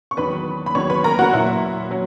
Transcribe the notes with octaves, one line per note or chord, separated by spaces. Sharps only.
C#6
E2 D#3 F#3 B4 B5
B5
E2 D#3 F#3 C#5 C#6
B4 B5
A#4 A#5
F#4 F#5
A#2 F#3 E4 E5
F#3